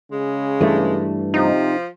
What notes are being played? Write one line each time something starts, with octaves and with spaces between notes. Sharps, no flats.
C#3 G#3
G2 E3 A3
C3 F3 D#4